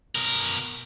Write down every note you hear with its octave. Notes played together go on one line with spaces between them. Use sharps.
B2 A#4